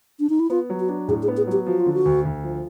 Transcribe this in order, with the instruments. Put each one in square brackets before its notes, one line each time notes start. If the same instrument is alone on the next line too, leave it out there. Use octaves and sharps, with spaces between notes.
[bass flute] D4
D#4
E4
[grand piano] B3 [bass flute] F4
[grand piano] F#3
[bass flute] F#4
[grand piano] D4
[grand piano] A2 [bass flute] G#4
[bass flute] G#4
[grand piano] B3
[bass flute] G#4
[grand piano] F#3 [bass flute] G4
[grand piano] F3 [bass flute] F#4
[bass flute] F4
[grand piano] D3
[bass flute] F#4
[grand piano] D2
D2
F3